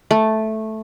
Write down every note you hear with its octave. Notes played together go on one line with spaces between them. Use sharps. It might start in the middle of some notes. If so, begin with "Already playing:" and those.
A3